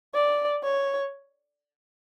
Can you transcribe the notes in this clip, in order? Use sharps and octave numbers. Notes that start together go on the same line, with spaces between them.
D5
C#5